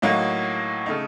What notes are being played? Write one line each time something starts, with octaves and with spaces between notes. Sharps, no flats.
A2 F#3 A#3 D#4
C#3 A3 D#4